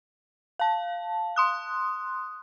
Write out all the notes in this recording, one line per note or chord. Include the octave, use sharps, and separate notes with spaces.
F5 A5
C6 D#6 F#6